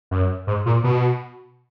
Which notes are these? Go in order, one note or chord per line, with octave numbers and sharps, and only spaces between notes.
F#2
G#2
A#2
B2